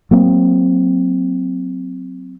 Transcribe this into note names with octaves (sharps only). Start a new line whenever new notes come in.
F#3 A#3 C4